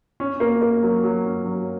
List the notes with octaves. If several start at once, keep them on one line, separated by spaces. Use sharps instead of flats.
C#4
A#3
A#3
F#3
F#3
C#4
F#3